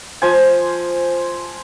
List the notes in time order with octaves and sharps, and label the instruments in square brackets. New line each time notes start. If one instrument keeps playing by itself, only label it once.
[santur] F3 C5 G#5